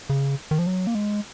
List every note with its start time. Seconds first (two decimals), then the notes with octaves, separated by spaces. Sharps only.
0.10 C#3
0.51 D#3
0.58 F3
0.67 F#3
0.87 A#3
0.95 G#3